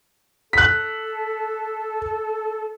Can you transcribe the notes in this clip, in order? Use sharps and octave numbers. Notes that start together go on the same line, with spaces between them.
A4 F#6 B6